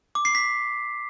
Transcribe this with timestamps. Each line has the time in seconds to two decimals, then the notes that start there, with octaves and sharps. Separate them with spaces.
0.15 D6
0.25 C7
0.35 B6